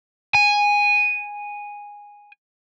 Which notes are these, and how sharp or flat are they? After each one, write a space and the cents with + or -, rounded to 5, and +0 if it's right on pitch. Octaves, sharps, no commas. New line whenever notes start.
G#5 -10